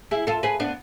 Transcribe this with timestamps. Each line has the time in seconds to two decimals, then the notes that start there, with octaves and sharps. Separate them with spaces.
0.11 E4 G#4
0.27 F4 A4
0.43 G#4 B4
0.60 B3 D4